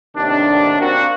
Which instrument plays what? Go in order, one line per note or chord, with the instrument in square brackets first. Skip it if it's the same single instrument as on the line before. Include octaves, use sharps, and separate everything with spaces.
[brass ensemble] D#2 A2 C3 D#3 D4
A#3 C4 F#4